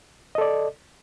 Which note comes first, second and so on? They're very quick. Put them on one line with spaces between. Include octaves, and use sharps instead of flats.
D#5 A4 D5